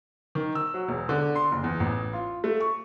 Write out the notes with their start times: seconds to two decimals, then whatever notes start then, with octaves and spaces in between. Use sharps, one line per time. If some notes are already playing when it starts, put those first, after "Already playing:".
0.35 D#3
0.55 E6
0.74 F#3
0.88 E1
1.09 D3
1.35 C6
1.52 F#1
1.63 E2
1.80 A1
2.13 F4
2.44 A3
2.60 C#6